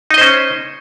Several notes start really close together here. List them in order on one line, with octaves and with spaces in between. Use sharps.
D#4 D#5 C5 C#4